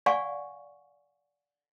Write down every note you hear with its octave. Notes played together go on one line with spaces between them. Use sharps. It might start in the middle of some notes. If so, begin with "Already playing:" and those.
D5 F5 F#5 G#5 C#6